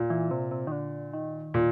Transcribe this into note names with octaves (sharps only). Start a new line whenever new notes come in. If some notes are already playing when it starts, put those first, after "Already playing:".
Already playing: A#2
E3
C3
C3
D#3
D3
D#3
A#2